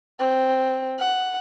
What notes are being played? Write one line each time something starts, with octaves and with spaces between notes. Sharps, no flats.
C4
F#5